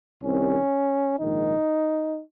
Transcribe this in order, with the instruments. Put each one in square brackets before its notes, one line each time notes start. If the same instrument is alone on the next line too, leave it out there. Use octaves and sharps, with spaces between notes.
[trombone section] C2 C3 D#3 C#4
A#1 G#2 D#3 D#4